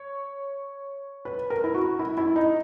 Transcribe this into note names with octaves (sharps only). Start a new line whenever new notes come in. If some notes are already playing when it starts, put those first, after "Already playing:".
Already playing: C#5
B4
A#4
E4
F#4
E4
E4
D#4